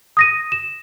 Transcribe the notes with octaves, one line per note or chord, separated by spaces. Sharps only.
D#6 A#6 D#7
E7